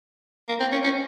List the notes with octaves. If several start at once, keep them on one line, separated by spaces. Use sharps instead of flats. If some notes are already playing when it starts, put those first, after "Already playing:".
A#3
C4
C#4
C#4